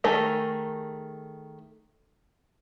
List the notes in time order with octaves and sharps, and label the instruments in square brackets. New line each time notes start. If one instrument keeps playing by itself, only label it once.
[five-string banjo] D#3 A3 G#4 A#4